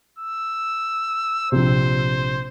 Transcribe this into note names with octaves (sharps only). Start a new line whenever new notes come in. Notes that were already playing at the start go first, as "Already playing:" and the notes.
E6
A#1 C3 C5